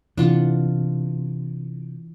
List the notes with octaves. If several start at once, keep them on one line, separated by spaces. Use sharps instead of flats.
C3 E3 D4 F4 F#5